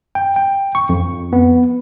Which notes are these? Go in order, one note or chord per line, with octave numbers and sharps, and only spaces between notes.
G5
G5
C#6
F2
B3